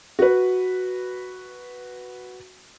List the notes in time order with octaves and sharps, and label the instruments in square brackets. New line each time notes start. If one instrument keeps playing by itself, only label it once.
[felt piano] F#4 B4